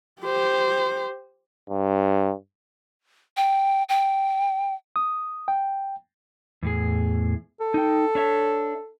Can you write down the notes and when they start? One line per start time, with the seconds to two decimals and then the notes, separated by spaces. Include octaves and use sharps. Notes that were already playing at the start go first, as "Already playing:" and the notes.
0.21 G4 C5
1.70 G2
3.37 G5
3.89 G5
4.96 D#6
5.48 G5
6.63 E2 A2 G#4
7.61 A4
7.74 D#4 G5
8.15 D4 C#5 E5